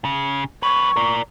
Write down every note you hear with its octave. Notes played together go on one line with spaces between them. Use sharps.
C#3
F2 B4 C#6
A#4 D5